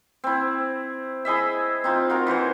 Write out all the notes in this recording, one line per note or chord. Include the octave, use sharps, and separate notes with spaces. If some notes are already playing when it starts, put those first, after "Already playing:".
C4 E4
E4 G#4 D#5 E5
C4 D#4 F4
F4 F#4 A#4
E3 F#4 C5 C#5